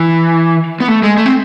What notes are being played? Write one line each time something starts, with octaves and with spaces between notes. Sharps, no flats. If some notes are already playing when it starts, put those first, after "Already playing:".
Already playing: E3
B3
A3
G#3
A3
C4